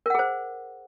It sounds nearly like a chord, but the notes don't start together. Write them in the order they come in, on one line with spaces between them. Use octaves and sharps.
A#4 F#5 G#4 C5